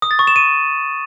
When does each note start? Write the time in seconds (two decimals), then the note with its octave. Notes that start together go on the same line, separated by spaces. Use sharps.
0.02 D#6
0.11 A6
0.19 C#6
0.27 E7
0.36 D#7